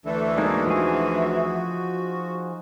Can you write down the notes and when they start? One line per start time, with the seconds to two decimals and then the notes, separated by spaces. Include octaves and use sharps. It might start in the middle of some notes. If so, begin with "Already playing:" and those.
0.06 D2 E3 A3 D4 A4
0.38 G#3 A#3 D#4
0.67 F3 F#4 G#4